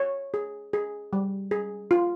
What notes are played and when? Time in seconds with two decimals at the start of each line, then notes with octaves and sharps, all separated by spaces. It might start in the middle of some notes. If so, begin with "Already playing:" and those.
Already playing: C#5
0.34 G#4
0.73 G#4
1.13 G3
1.51 G#4
1.91 F4